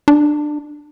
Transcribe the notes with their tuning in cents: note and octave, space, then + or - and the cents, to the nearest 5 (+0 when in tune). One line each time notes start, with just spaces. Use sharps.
D4 +20